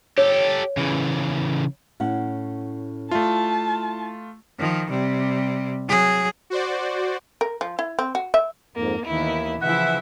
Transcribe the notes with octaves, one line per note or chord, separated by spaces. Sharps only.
G4 A4 C#5
C#3 E3
A2 C#4 F#5
A3 E4 F4 D5 A5
D#3 F3
C3 G3
F#3 G#4
F#4 C5 D5
A#4
F3
E4
C4
F#4
E5
F2 G#2 A#3
D#2 D#3 E3 B3 E4
C#3 E3 F3 E4 E5 F#5